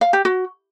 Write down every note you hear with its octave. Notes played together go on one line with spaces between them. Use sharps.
F5
G4
F#4